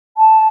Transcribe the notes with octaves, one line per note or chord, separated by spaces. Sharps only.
A5